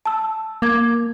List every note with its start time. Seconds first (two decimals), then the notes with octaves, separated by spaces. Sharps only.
0.06 A5 E6
0.62 A#3 D6 G#6